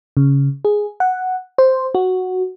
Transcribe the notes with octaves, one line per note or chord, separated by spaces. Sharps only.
C#3
G#4
F#5
C5
F#4